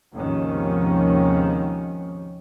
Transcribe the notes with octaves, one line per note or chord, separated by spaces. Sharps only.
D#2 G#2 C3 D#3 F3 C#4